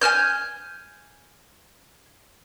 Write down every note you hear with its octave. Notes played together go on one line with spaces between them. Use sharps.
G#5 A5 F6 G6